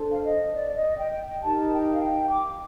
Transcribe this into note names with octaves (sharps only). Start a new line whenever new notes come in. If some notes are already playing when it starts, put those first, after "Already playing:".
Already playing: D4 A4 C5
F5
D#5
D5
D#5
G5
D#4 G4 A#4 A5
G5
F5
G5
D6